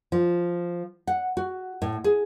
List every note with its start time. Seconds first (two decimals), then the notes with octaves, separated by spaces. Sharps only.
0.12 F3
1.07 F#5
1.37 F#4
1.82 A2
2.04 G#4